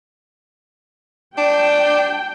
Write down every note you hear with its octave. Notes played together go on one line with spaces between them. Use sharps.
D4 G5